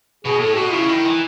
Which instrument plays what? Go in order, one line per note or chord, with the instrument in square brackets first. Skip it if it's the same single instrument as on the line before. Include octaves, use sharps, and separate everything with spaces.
[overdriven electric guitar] B2 [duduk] G#4
[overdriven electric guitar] A2 [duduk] A4
[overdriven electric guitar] B2 [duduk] F#4
[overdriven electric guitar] C#3 [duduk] E4
[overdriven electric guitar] D#3 [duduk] E4
[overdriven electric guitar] E3